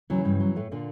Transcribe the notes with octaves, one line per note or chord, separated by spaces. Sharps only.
D#2 C#3 E3 F#3
G2 G3
F#3
A2 A3
A#2 D3 A#3